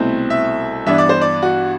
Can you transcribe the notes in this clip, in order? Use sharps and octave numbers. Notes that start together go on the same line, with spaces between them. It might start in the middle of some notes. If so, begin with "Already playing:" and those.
Already playing: C2 B2 A3 C4 E4
E5
G2 E3 B3 D4 E5
D5
C5
D5
F#4